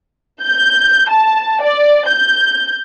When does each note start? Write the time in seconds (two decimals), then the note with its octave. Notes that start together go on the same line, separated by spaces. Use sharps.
0.41 G6
1.11 A5
1.64 D5
2.08 G6